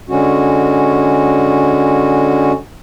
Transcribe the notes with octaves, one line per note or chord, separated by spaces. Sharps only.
D3 G#3 C#4 F#4